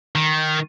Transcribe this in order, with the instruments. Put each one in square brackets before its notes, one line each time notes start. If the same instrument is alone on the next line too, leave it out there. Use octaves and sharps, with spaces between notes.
[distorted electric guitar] D#3